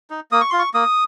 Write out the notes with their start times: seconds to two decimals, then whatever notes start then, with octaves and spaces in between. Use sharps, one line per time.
0.10 D#4
0.31 A#3 D#6
0.41 C#6
0.50 F4 C6
0.59 C#6
0.74 A#3 D#6